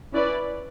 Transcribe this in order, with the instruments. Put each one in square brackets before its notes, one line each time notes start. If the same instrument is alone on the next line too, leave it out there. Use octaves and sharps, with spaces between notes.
[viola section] C#4 E4 B4 D5